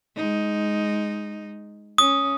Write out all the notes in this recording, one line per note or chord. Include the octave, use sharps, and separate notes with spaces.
G#3 D#4
C#4 D#6